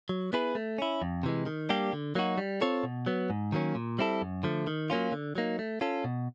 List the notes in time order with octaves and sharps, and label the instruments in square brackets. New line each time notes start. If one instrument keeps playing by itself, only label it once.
[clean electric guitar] F#3
B3 E4 G#4 B4
A3
C#4 E4
F2
C3 E3 G#3
D#3
G3 A#3 D4 G4
D3
F#3 A#3 D#4 F#4
G3
C4 F4 A4 C#5
B2
F#3 B3
G#2
D#3 F#3 A#3 C#4
A#2
G3 C4 E4 A4
F#2
D3 F3 A3
D#3
F#3 A#3 C#4 F4
D3
F#3 A#3 D#4
A3
C#4 F4 A4
B2